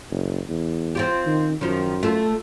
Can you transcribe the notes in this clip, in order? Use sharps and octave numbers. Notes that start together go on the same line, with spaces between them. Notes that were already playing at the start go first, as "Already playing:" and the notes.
F#1
E2
C4 F4 G4
D#3
F#2 D#3 F3
A3 F4